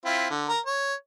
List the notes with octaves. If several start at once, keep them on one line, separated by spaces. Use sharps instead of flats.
C4 E4 F4
D3
A#4
C#5